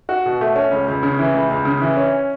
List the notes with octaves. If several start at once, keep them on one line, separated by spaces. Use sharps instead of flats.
F#4
B2
A3
C#4
C#2
C#2
C#3
E3
C#2
C#2
C#3
E3
C#4